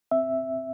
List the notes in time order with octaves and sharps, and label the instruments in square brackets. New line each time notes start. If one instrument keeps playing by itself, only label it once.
[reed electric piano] C4 E5